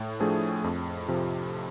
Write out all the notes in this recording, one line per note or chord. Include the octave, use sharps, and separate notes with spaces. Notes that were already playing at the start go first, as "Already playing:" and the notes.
Already playing: A2
F3 A3 D4 G#4
F2
C3 F3